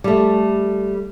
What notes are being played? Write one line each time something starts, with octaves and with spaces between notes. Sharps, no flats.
G3 A3